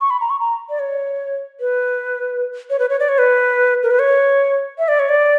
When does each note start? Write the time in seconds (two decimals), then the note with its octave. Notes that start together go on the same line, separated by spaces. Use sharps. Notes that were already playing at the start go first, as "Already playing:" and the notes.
0.01 C#6
0.10 B5
0.21 A#5
0.30 C#6
0.40 A#5
0.70 D5
0.79 C#5
1.60 B4
2.70 C#5
2.79 B4
2.90 C#5
3.00 D5
3.09 C#5
3.18 B4
3.83 A#4
3.91 B4
3.99 C#5
4.78 E5
4.88 D5
4.99 C#5
5.09 D5